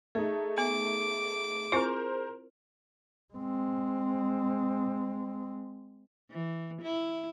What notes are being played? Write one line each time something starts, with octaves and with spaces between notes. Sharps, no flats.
A3 D#4 G#4
B3 D6
C4 E4 F4 A#4 C5
G#3 C4
E3
E4